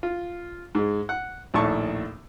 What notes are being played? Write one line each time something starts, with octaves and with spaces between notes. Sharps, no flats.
F4
G#2 G#3
F#5
A#1 D#2 A2 A5 C#6